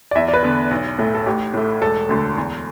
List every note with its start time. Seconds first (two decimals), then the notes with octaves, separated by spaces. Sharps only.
0.11 D5
0.15 E2 E5
0.28 D5
0.34 B4
0.43 D3 B3
0.71 B1
0.98 A2 A3
1.15 A4
1.26 A1 G4
1.54 A2 A3
1.81 E1 A4
2.09 D2 D3
2.37 E2